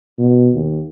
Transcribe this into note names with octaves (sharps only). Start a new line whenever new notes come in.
B2
D#2